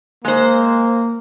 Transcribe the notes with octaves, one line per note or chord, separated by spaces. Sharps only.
G#3 A#3 C5